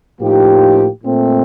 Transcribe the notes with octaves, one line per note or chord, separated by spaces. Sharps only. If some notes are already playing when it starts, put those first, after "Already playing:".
A2 F3 A#3 D#4 G4
A#2 A3 C4